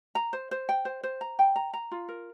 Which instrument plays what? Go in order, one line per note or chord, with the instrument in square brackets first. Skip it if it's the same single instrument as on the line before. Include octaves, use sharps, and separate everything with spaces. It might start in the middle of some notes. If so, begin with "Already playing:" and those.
[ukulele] A#5
C5
C5
G5
C5
C5
A#5
G5
A#5
A#5
F4
A#4